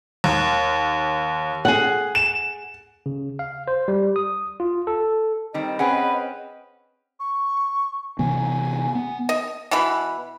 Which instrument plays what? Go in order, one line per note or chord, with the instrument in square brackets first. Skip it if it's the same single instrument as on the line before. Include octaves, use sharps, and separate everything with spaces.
[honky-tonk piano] D#2
[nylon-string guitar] G#4 F#5
[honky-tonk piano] E7
[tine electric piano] C#3
F5
C5
G3
D#6
F4
A4
[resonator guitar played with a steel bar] D#3 G3 C4 [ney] D#5
[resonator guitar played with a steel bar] C4 C#4 G#4 [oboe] B4 [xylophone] F#5
[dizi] C#6
[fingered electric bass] C3 E3 B3 [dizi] G#5
[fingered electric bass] B3
[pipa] D#5
B2 E3 B4 B5